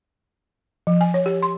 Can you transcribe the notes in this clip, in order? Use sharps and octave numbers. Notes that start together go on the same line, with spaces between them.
F3
G#5
C#5
G4
C6